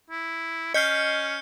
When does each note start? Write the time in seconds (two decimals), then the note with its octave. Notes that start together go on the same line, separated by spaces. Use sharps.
0.10 E4
0.74 C#4 D#5 F6 G6 C7 C#7